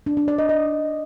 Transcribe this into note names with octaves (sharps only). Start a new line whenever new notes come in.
D4
D4
D5
D#5
D#5